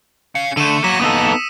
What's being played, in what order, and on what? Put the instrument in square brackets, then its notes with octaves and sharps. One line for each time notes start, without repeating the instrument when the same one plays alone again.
[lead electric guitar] C#4 F5 [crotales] C#7
[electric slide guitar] D3 [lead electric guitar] A3 A4 [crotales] D#7 E7
[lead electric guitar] E2 A#3 [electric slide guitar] F#3 [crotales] B6 E7
[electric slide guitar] B3 D#4 A4 [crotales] D#6 E6